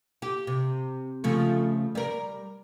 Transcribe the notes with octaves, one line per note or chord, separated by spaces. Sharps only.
G4
C3
C#3 F3 A3
G3 A#4